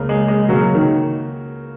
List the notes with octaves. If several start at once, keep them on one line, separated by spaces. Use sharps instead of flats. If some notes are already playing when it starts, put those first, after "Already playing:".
Already playing: C#2 C#3 A#3
G#3
G#3
C#3 F#3 A#3 F#4
D#3